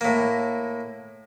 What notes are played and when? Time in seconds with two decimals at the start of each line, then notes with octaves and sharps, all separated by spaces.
0.01 A2 A#3